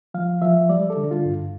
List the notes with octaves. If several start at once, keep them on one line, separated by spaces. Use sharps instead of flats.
F3 F5
F3 E5
G3 D5
A4
D3
F4
G2